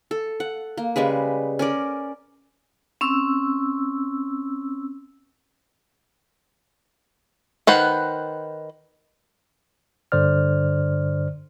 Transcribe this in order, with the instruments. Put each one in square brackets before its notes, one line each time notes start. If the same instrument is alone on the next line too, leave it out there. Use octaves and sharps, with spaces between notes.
[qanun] A4
F#5
A#3
C#3 G3 G#3 B4
C#4 A#4 D5
[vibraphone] C4 C#4 E6
[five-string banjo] D#3 B4 C5 F#5
[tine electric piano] G2 D3 C5 D5 F6